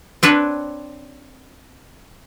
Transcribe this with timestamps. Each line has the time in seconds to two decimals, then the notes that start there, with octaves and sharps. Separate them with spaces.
0.23 C4 D4 B4 C#5